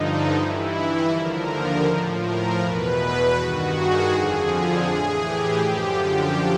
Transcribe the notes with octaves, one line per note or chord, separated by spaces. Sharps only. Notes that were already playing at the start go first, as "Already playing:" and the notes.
Already playing: G2 D3 F3 D#4
G2 E3 E4
D#2 D3 F3 A#4
A2 F3
A#4
E2 B2 B4
G2 D#3 F#4
G#4
F2 D3 F3 G#4
G#4
A2 E3
G4
F#2 D3 F3